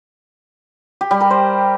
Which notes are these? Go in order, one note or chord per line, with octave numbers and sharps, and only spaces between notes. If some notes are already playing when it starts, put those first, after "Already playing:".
G4
G3
A#4
C5